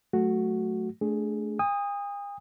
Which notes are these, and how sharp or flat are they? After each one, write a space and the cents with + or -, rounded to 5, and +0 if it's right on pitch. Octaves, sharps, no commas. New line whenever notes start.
F#3 +0 A3 -5 F#4 +0
A3 -15 D4 +0 G#4 +0
G#5 -45 D#6 +0